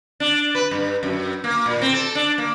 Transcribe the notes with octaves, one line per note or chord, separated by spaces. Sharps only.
D4
B4
G2
F#2
A#3
A#2
C4
A4
D4
A#3